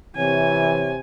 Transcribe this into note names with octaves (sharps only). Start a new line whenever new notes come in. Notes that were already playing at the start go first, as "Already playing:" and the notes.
C3 E3 C#5 G#5